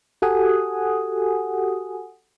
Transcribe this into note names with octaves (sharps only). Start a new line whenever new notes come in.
F#4 G4 A4 F#5 G#5 D#6